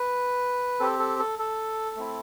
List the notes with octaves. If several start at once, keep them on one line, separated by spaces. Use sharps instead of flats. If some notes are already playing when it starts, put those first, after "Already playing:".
Already playing: B4
C4 G4 A4
A4
A4
A4
A3 C4 E4